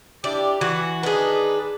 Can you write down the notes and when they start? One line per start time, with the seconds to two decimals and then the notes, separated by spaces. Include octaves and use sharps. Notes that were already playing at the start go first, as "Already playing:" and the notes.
0.24 D4 E4 G4 D5
0.61 E3 F#4
1.03 D#3 D4 G#4 B4